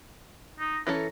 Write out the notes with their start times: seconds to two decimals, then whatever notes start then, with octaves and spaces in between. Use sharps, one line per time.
0.60 D#4
0.87 E3 C#4 A4 A#5